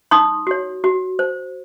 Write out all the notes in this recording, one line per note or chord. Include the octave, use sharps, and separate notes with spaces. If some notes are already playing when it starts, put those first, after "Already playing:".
D#4 C6 D#6
F#4 C#5
F#4
C5